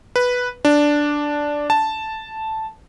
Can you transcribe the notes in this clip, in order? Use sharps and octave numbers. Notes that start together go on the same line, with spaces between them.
B4
D4
A5